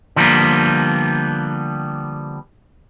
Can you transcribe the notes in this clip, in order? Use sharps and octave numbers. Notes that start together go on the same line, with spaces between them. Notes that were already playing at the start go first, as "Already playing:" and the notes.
D3 F3 G3 G#3 A#3 B3